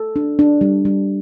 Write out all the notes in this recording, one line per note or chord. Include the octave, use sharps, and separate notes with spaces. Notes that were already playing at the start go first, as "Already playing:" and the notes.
Already playing: A4
D4
D4
G3
G3